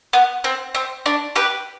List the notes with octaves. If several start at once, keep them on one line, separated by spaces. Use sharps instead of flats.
B3
C4
C4
D4
G4 B4